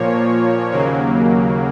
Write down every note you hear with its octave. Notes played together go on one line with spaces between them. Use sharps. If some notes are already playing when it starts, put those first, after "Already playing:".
Already playing: A#2 F3 A#3 C#5
D#2 C#3 F#3 A#3